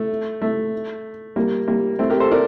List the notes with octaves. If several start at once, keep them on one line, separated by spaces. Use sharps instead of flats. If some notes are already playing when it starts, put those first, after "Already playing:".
Already playing: A3
A3
G3 A#3
G3 A#3
A3 C4
G4 A#4
A4 C5
A#4 D5